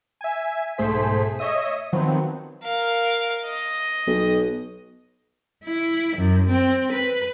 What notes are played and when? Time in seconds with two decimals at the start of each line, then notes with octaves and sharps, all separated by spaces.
0.21 E5 G#5
0.78 B1 G#2 A3 G#4 C5 B6
1.39 C#5 D#5 E5 D#6
1.93 D#3 F3 F#3 B3 C4
2.64 A#4 F5
3.45 D#5
4.06 B1
5.64 E4
6.17 F#2
6.50 C4
6.93 B4